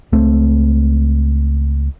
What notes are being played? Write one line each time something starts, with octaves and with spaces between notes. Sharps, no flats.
C#2 A3 C4